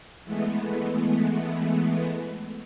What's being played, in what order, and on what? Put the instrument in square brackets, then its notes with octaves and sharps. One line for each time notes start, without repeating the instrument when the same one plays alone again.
[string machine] E3 G#3 A3 B3